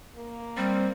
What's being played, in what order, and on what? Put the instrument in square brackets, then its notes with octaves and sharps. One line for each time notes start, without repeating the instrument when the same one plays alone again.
[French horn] A#3
[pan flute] G3 [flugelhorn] C4